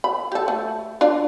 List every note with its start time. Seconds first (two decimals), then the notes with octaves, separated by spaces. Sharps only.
0.04 B5
0.32 G4 A4
0.48 A3
1.01 D4 F4 D5